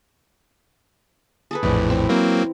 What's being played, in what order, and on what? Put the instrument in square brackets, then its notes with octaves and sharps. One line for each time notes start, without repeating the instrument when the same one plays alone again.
[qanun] G#4 A4 B4
[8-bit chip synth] A#1 F2 A2 [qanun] E3 D5
[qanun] C4 E4
[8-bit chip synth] F#3 A#3 C4 [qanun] A#5